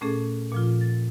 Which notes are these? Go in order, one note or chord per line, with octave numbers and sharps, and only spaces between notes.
A#2 A3 C#4 G#4 A4
A#2 F3 F4
A6